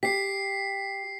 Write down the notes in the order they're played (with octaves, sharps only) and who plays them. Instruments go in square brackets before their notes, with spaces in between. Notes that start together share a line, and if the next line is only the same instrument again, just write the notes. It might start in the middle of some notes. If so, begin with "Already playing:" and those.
[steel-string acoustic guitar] G4 [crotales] B6 C7